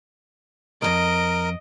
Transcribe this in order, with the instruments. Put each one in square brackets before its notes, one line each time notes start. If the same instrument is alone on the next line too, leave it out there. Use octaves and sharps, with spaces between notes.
[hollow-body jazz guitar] B1 F2 [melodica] A#4 [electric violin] D#5 D7